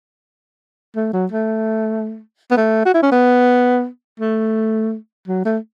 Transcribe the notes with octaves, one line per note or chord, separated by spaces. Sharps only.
A3
F#3
A3
B3
A3
F#4
E4
C#4
B3
A3
F#3
A3